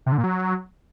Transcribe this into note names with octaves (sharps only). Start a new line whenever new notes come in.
C3
D3
A#2
F#3